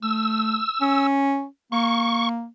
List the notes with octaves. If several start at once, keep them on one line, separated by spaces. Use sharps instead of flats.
A3 E6
C#4
A#3 C#6